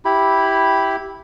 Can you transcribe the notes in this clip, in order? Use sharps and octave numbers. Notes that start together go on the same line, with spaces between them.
E4 G4 B5